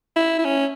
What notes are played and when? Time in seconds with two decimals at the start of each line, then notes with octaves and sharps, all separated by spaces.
0.16 E4
0.39 E4
0.45 C#4